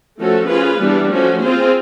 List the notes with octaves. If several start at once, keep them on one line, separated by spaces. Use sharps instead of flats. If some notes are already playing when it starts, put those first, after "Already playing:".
F3 A3 C#4 F#4 A4
C#4 F4 G#4 B4
E3 G3 B3 D4
F3 A3 C#4 F#4
C4 F4 G#4 C5